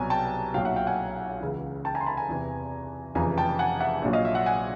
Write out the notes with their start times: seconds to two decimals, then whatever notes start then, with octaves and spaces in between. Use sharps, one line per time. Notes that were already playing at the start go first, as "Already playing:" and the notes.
Already playing: C2 B2 F#3 G#5 A#5
0.10 G5 A5
0.54 B1 A#2 F#3 F5 G5
0.65 E5 F#5
0.76 F5 G5
0.87 F#5 G#5
1.40 C#2 C#3 E3
1.85 G5 A5
1.95 G#5 A#5
2.01 C6
2.06 A5 B5
2.17 G#5 A#5
2.29 E2 C3 E3
3.15 F1 F2 C#3 E3 G#5 A#5
3.38 G5 A5
3.59 F#5 G#5
3.80 E5 F#5
4.02 A#1 A#2 F#3
4.13 D#5 F5
4.25 E5
4.35 E5 F#5
4.46 F#5 G#5